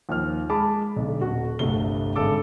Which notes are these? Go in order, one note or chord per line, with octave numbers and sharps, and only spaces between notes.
D#2 F3 F6
G#3 A5 B5 D6
B1 D3
D#1 F#4
G1 C2 C3 A3 G7
G#1 G2 D3 G#3 A4 D6